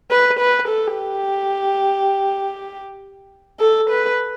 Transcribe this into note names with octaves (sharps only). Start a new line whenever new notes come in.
B4
B4
A4
G4
A4
B4